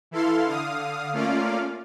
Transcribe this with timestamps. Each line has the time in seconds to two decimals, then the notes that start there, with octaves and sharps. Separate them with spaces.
0.11 E3 E4 A4 F5 C6
0.46 D3 F5 D#6
1.13 A3 A#3 C#4 F4 D5 F5